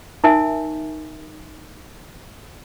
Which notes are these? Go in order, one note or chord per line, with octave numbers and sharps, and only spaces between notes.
D#4 A#4 E5 G#5